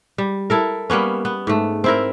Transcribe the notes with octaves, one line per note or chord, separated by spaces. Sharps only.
G3
E4 A4 A#4
G3 A#3 B3 C#4
B3
G#2 A3
C4 E4 A#4